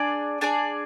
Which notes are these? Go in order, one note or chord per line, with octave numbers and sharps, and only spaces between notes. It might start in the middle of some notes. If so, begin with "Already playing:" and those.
Already playing: D4 G#4 D5
D4 G#4 D5